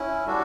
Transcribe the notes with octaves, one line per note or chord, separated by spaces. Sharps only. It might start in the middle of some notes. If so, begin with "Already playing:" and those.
Already playing: C#4 E4
G3 D4 F#4 A4